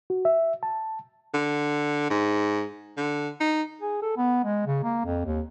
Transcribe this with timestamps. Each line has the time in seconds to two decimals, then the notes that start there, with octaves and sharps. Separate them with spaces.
0.10 F#4
0.25 E5
0.63 A5
1.34 D3
2.10 G#2
2.97 D3
3.40 D#4
3.81 G#4
4.02 A4
4.17 B3
4.44 G#3
4.67 C#3
4.83 A#3
5.05 F2
5.25 D#2